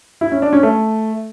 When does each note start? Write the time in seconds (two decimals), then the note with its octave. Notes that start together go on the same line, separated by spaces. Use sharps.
0.21 E4
0.32 C#4
0.42 D4
0.53 C#4
0.63 A3